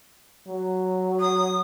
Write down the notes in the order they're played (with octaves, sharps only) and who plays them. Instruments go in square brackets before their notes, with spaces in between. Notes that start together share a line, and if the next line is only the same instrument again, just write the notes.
[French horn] F#3
[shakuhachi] D#6